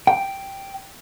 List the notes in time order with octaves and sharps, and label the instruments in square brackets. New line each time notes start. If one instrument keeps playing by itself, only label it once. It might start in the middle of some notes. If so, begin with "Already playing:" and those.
[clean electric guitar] G5